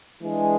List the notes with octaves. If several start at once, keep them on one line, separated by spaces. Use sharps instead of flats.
E3 G#3 D4 G#4